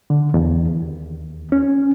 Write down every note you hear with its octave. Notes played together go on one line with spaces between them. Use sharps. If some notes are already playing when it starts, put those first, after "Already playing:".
D3
E2
D#2
C#4